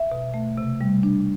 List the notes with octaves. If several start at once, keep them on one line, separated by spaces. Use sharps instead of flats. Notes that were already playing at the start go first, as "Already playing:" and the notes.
Already playing: E5
B2
A3
C3
G3
D4